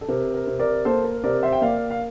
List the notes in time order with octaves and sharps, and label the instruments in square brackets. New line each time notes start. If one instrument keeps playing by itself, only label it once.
[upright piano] A4
C3 A#4
A#4
C3
A#4 D5
A#3 A4 C5
A#4
C3 A#4 D5
C5 E5
G5
A#3 D5 F5
F5